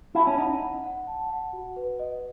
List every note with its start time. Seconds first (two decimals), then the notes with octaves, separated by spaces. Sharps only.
0.15 E4 A5
0.27 C#4
0.38 D#4 F#5
0.61 F#5
0.84 F#5
1.07 A5
1.30 F#5
1.53 F#4
1.76 B4
1.99 D#5